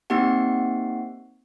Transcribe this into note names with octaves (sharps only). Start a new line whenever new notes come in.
A#3 C4 D#4 G4 F#5